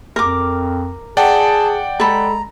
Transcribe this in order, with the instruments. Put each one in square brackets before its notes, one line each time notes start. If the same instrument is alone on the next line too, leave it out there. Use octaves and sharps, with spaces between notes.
[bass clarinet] F2 [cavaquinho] A#4 D6
[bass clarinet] G#4 [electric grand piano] D5 F#5 G5 [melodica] A5
[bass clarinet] G#3 [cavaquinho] A4 B5 [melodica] A#5